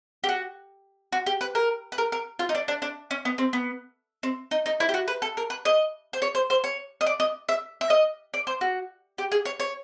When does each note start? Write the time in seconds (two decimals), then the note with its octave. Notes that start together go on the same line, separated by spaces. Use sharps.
0.24 G4
0.29 F#4
1.12 F#4
1.26 G4
1.41 B4
1.55 A#4
1.92 B4
1.98 A#4
2.12 A#4
2.39 F4
2.49 D#4
2.55 D4
2.68 D4
2.82 D4
3.11 C#4
3.25 B3
3.38 C4
3.53 B3
4.23 C4
4.51 D#4
4.66 D#4
4.80 E4
4.89 G4
4.94 F#4
5.08 B4
5.22 A4
5.37 A#4
5.50 B4
5.65 D#5
6.13 C5
6.22 C#5
6.35 C5
6.50 C5
6.64 C#5
7.01 D#5
7.06 D5
7.20 D#5
7.49 E5
7.81 E5
7.90 D#5
8.34 D5
8.47 C5
8.61 F#4
9.18 G4
9.32 G#4
9.45 C#5
9.60 C#5